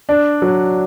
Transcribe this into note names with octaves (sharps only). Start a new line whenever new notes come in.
D4
F#3